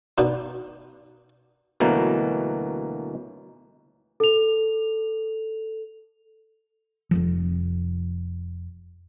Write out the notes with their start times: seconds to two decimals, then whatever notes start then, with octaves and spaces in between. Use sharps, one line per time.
0.18 B2 B3 D4 D#4
1.80 D2 B2 E3 F#3 A#3
4.20 A4 F7
7.11 F1 C#2 F3